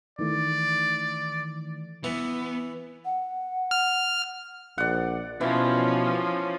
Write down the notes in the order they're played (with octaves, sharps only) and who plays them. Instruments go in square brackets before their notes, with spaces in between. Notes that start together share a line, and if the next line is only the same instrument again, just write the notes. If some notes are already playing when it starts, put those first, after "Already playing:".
[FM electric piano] D#3 E3 A3 [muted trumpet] D5
[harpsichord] E3 [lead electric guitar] B3
[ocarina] F#5
[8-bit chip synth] F6
[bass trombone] A#1 [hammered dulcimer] D5 F#5
[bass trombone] B2 [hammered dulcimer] E3 [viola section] F3 C#4